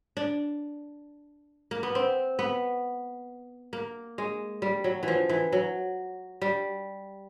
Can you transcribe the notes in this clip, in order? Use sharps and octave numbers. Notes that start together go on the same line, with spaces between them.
D4
A#3
B3
C4
B3
A#3
G#3
G3
F#3
E3
F3
E3
F#3
G3